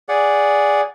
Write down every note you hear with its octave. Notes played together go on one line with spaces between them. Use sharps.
G#4 D5 F#5